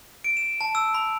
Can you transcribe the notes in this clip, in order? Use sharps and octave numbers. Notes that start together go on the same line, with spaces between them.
D7
E7
A5
E6
B5